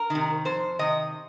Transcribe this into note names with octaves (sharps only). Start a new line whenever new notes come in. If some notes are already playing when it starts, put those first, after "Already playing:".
Already playing: A#4
C3 D#3
F2 C5
C3 D#3 D#5